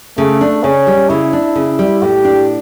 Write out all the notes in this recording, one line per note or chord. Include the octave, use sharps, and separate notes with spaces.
C#3 A3
D4
C#3 C#4
G3
C#3 E4
D4
C#3
G3
A2 G4
D4